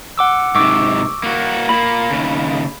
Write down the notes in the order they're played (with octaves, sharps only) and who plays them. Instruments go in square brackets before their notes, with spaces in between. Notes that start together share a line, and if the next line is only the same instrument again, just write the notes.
[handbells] F#5 D6 E6
[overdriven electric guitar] G#2 C3 [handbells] C#6 D6 E6
[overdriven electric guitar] A#3 F#4
[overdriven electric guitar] A#2 A#3 [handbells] B5
[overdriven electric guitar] D#2 C#3